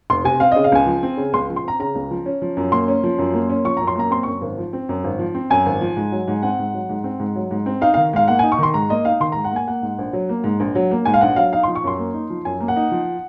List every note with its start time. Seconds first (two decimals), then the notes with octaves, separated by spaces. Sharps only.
0.10 F1 C6
0.24 C3 G#5
0.40 C4 F5
0.52 C#3 D#5
0.64 F5
0.72 C#2 G#5
0.86 F3
1.03 C4
1.17 C#3
1.33 C#2 C6
1.49 F3
1.56 C6
1.64 C4 A#5
1.79 C#3 A#5
1.95 C#2
2.11 F3
2.26 C#4
2.42 F3
2.57 F#2
2.72 A#3 C6
2.88 C#4
3.03 F3
3.18 F#2
3.34 A#3
3.49 C#4
3.65 F3 C#6
3.77 F#2 A#5
3.87 C6
3.96 A#3 A#5
4.11 C4 C6
4.23 F#2 C#6
4.41 G#1
4.58 F3
4.73 C4
4.89 F#2
5.04 G#1
5.19 F3
5.35 C4
5.50 F#2 G#5
5.66 G#1
5.81 F3
5.96 G#2
6.12 F#3
6.28 G#2
6.42 C4 F#5
6.59 G#2
6.74 F#3
6.89 G#2
7.04 C4
7.20 G#2
7.36 F#3
7.51 G#2
7.66 C4
7.81 D#4 F5
7.94 D#3 F5
8.13 G#2 F5
8.28 A#3 F#5
8.39 D#4 G#5
8.52 C#6
8.58 D#3 C6
8.74 G#2 A#5
8.90 A#3 D#5
9.05 D#4 F5
9.20 D#3 C6
9.32 G#2 A#5
9.44 F#5
9.51 A#3 G#5
9.67 A#3 F#5
9.82 G#2
9.99 A#1
10.13 F#3
10.29 A#3
10.44 G#2
10.60 A#1
10.75 F#3
10.91 A#3
11.05 G#2 G#5
11.14 F5
11.21 A#1 F#5
11.36 F#3 F5
11.52 D#4 F5
11.63 F3 C6
11.75 C#6
11.84 F#2 C6
11.98 A#3
12.14 D#4
12.30 F3
12.45 F#2 G#5
12.60 A#3
12.68 F#5
12.76 D#4
12.91 F3